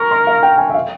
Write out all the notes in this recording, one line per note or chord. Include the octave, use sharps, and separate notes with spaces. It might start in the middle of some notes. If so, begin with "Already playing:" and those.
Already playing: A#4 C#6
C6
F5
G5
G#5
E5
F5